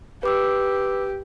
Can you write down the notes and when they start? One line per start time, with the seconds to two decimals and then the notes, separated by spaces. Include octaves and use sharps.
0.23 G4 B4 D6 E6